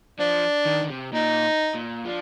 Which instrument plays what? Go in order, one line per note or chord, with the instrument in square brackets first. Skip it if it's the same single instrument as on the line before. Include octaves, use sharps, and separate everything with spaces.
[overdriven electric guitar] F3 [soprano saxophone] D4
[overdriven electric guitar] D#3
D3
C3
[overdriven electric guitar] A#2 [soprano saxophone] D#4
[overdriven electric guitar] A#2
[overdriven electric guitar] F3 [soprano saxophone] D4